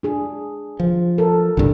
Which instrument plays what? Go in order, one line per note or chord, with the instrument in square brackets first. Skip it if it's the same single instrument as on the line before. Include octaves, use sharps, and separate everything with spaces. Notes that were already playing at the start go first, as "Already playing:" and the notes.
[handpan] D4 G#4
[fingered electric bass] F3
[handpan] A4 A#4
[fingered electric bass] C2 G2 [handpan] D3 E3 D4